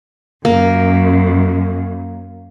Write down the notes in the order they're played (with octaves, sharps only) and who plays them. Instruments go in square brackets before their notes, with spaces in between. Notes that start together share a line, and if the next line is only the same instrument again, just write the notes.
[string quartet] F#2 [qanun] A#3